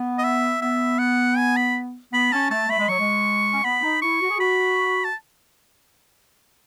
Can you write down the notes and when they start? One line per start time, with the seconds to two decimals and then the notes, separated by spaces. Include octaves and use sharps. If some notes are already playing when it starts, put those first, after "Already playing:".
Already playing: B3
0.18 D#5
0.24 E5
0.61 B3 E5
0.99 F#5
1.37 G#5
1.57 B5
2.13 B3 B5
2.32 C#4 A5
2.51 A3 A5
2.69 A3 B5
2.79 G#3
2.89 F#3 C#6
2.99 G#3
3.53 C#4
3.64 B3 B5
3.82 D#4
4.02 E4 C#6
4.21 F#4
4.29 G#4
4.38 F#4 B5
5.05 A5